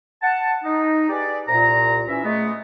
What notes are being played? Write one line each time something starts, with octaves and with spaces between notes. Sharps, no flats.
F#5 A5
D#4
G4 G#4 B4 D5
C2 A#2 A#5
E3 C#4 E5
G#3 A3 B3